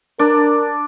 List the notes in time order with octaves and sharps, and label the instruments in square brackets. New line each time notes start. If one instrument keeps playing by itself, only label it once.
[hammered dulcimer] D4 [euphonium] A#4